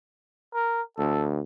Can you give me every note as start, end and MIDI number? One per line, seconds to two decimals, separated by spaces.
0.54 0.82 70
0.98 1.40 38
0.98 1.26 69